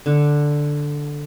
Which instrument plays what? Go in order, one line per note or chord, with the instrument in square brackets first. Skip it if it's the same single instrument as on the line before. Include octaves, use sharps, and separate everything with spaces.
[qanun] D3